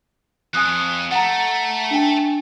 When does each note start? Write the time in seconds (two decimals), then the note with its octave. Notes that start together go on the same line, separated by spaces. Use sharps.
0.54 F2 G#5 D#6 F#6
1.11 A3 F#5 A#5
1.91 D4 G5 G#5